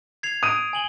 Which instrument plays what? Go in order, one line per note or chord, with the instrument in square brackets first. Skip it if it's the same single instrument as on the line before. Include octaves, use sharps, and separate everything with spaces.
[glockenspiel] G#6 C7 F7
[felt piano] D#6 D#7 [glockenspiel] D7
[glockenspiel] G#5 F#7 G7